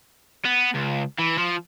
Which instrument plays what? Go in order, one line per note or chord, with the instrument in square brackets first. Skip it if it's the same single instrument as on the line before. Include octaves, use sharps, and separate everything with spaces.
[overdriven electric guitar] B3
C#2
E3
F3